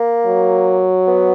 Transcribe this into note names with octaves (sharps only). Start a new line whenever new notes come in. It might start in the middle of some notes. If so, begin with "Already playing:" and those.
Already playing: A#3
F#3
B3